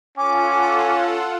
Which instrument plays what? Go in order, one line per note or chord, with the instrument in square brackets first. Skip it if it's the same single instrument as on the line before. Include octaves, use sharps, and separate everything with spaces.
[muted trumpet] C#4 [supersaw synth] F4 A4 F#5 [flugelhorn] G#5 [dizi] D6